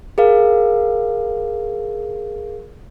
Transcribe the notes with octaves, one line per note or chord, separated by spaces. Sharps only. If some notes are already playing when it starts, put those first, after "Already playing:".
G#4 A#4 F5